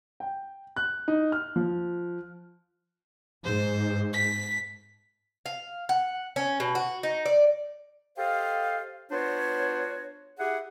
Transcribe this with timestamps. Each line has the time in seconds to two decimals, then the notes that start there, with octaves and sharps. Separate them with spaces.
0.20 G5
0.76 F#6
1.08 D#4
1.32 F6
1.56 F3
3.45 G#2 C5
4.13 B6
5.46 F5
5.89 F#5
6.36 C#4
6.60 B2
6.75 F#4
7.03 D#4
7.26 D5
8.18 G4 A4 C5 D#5 F5
9.12 B3 D4 F4 F#4 C5 C#5
10.39 E4 G4 G#4 F#5